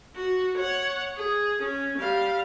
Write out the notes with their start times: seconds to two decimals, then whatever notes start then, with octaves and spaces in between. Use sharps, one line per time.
0.16 F#4
0.57 C#5 F#5
1.16 G#4
1.62 C#4
1.98 G3 F5